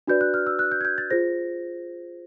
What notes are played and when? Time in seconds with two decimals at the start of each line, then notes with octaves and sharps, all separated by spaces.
0.07 D4 F#4 B4 D5 G6
0.21 F#6
0.34 F6
0.47 E6
0.59 F#6
0.72 G6
0.81 G#6
0.85 G6
0.98 A6
1.11 F4 G#4 C5 A#6